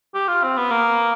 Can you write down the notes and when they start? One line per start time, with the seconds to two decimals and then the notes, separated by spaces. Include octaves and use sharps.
0.14 G4
0.28 F4
0.43 C4
0.57 B3
0.71 A#3